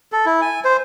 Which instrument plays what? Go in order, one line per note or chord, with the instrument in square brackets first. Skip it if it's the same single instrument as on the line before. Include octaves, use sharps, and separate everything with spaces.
[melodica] A4
E4
G#5
C5